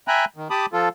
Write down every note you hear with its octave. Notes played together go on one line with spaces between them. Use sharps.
E5 G5 G#5 A#5 B5 F#6
D#3
G4 A5 B5 D6 D#6
F3 F4 A4